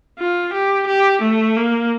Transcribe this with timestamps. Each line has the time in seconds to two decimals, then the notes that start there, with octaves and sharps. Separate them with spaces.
0.19 F4
0.54 G4
0.87 G4
1.22 A3
1.57 A#3